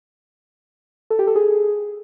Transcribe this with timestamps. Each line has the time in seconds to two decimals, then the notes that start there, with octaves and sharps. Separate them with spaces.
1.10 A4
1.19 G4
1.27 A4
1.36 G#4